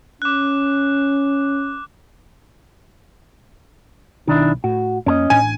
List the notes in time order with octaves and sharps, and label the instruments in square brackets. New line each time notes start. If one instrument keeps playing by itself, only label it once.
[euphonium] C#4 [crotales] D6 F#6
[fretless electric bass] B1 [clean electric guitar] D#3 D4 E4
[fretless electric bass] A2 [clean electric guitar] F#4
[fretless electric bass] F2 A#3 [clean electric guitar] C#4 A4 D#5
[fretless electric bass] A1 A2 D4 [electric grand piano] G#5